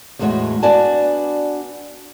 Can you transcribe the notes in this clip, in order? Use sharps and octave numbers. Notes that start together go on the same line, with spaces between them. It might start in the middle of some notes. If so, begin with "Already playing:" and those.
E2 A2 G#3 A3 F#4 C#5
B3 D4 F#4 D5 G#5 A5